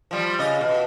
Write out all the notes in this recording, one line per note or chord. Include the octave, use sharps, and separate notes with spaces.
F3 G3
C#3 D#5
B2